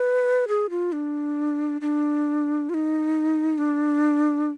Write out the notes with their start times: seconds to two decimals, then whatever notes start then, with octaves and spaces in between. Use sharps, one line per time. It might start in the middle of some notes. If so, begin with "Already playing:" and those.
Already playing: B4
0.48 G#4
0.70 F4
0.92 D4
1.81 D4
2.69 F4
2.74 D#4
3.58 D4